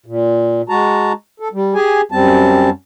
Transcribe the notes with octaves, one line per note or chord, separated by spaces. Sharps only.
A#2
G#3 F#4 A5 A#5
A4
G3
G4 G#4 G#5
F#2 G3 C4 A5